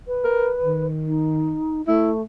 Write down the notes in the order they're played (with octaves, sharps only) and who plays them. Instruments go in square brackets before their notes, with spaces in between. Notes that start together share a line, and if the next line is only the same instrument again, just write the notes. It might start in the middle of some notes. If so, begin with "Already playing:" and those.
[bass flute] B4
[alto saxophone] A#4
D#3
[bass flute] D#4
[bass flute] A3 [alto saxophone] E4